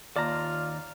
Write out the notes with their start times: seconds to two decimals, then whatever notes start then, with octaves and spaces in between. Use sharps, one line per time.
0.16 D#2 F4 D5 A5 A#5 F6